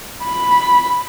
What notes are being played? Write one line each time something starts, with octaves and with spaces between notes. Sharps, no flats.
B5